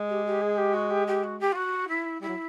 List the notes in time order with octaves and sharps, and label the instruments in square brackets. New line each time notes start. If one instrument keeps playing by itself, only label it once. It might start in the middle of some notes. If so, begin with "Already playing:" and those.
Already playing: [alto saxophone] G#3
[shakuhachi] G4
G4
G#4
G4
F#4
G4
G4
F#4
G4
F4
F#4
E4
[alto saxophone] G3 [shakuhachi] E4
[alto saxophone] F#3